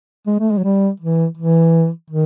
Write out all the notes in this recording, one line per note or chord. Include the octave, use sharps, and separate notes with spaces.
G#3
A3
G#3
F#3
G3
E3
E3
D#3